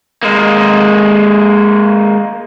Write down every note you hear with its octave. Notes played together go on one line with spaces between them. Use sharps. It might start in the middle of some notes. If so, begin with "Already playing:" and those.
G#3 A#3